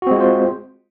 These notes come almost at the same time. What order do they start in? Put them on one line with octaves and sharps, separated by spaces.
F#4 C4 G#3 F4 C5